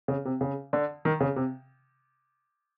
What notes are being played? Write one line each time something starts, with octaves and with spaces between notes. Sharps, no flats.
C#3
C3
C#3
D3
D#3
C#3
C3